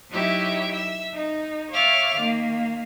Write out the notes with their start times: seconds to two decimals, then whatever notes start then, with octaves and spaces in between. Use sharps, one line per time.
0.10 F#3 D#4 E4 G4 C#5 E5
0.72 E5 E6
1.14 D#4
1.72 C#5 E5 F5 D6 F6 A6
2.17 D#3 A#3